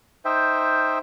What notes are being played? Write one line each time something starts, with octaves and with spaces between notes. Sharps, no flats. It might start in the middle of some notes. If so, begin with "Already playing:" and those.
D#4 C5 E5 G5